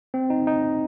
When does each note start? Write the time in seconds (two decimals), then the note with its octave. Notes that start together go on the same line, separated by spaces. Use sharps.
0.14 C4
0.30 D#4
0.47 D#4